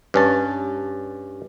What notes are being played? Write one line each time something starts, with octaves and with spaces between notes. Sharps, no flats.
G2 C#4 A5